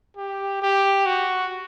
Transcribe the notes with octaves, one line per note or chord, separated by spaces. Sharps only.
G4
G4
F#4